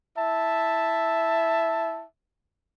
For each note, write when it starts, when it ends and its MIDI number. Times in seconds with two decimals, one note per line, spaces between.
0.17 2.04 64
0.17 2.04 76
0.17 2.04 81